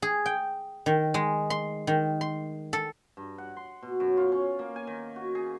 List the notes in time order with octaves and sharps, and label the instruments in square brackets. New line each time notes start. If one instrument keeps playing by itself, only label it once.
[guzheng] G#4
G5
D#3
G#3
C6
D#3
C6
A4
[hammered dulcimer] G2
F#5
C6
B2
F#2
F4
C#4
A#3
G#5
D#3
F#4
G#4